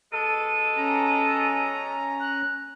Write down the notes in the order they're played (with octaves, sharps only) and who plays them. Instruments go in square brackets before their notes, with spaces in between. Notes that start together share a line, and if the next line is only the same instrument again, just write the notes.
[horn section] B2 G#3 A4 [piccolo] D#7
[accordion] C#4 A#5
[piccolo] F#6